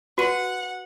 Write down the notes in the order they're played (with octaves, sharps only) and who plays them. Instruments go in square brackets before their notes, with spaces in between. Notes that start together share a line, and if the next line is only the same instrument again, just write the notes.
[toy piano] F#4 [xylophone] B4 D#7 F#7 [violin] F#5